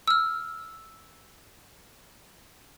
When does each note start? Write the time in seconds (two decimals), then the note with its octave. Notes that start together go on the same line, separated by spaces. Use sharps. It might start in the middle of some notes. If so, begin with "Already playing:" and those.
0.08 E6 F6